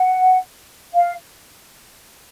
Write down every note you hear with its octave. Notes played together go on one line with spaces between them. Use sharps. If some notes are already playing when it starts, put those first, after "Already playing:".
Already playing: F#5
F5